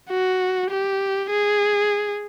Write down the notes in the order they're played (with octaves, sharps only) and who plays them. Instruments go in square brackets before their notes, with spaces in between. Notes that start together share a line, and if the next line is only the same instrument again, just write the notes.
[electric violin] F#4
G4
G#4